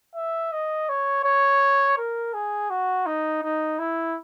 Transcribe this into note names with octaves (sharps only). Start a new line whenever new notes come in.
E5
D#5
C#5
C#5
A#4
G#4
F#4
D#4
D#4
E4